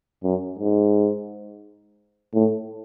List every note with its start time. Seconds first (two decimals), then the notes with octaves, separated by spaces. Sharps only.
0.24 F#2
0.59 G#2
2.34 A2